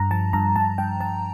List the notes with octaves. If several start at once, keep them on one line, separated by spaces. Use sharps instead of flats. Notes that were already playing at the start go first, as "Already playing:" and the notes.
Already playing: G2 A#5
F3 A5
G2 A#5
G2 A5
G2 G5
G2 A5